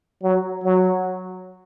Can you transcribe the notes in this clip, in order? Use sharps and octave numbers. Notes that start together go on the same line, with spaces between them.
F#3
F#3